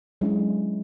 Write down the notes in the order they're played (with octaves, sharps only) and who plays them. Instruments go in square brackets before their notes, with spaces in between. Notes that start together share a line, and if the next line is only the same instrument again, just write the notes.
[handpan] F#3 G#3 C#4 D4 E4